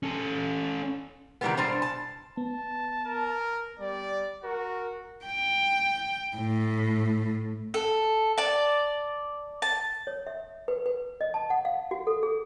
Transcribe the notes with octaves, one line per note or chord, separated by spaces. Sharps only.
C#4 A4
C3 D#3 E3 G3 G#3 B3
G2 B2 G3 D4 C5 A#5
A5
B3 A5
A#4
G3 D5
F#4 A#4
G5
A2
A4
D5 A5
A5
C#5
E5
B4
B4
D#5
A5
F#5
F5
F#4
A4
G#4